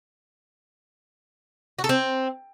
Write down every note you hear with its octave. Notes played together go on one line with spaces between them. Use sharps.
F#4
A4
C4